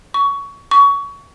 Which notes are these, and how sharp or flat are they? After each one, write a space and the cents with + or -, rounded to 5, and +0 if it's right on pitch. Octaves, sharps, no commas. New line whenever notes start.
C#6 +20
C#6 +25